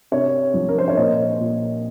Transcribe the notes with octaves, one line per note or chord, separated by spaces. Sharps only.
C3 C#5
F3
A#4
C5
C#5
A#2 D#5
A#2